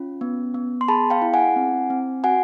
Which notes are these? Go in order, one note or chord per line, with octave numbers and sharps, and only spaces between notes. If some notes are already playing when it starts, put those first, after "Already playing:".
Already playing: C#4 F4
B3
B3
C6
G#4 A5 B5
F5 G5
E4
F#5 G#5
C4
C4
F#4 F#5 G#5